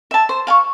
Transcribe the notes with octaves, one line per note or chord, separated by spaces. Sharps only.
E5 A5
C5
F5 G#5 C#6